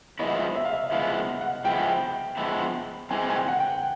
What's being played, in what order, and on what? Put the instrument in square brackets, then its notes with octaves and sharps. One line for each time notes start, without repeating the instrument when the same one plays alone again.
[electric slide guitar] F3 G#3 B3 E4 [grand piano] D#5
[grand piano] E5
F5
E5
[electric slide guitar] F3 G#3 B3 E4 [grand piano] F5
[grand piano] F#5
[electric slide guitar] F3 G#3 B3 E4 [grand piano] G5
[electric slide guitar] F3 G#3 B3 E4
[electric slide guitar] E3 G#3 C4 [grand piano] G#5
[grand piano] G#5
G5
F#5
G5